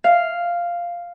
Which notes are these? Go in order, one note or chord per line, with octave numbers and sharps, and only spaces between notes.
F5